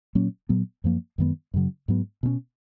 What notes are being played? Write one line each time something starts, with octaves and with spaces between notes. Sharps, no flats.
A#2 F#3 A#3 C#4
A#2 F#3 B3
F#2 F3 A#3
F#2 D#3 G#3 B3
F#2 C#3 F#3
G#2 F#3 B3
B2 A#3 C#4